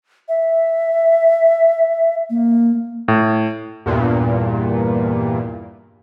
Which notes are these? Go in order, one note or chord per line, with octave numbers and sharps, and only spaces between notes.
E5
A#3
A2
E2 G2 A#2